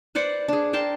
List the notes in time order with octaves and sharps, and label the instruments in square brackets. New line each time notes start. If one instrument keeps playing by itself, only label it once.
[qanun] B4 C5 D5 F#5
D4 G#4
A#4 G5 A5 C6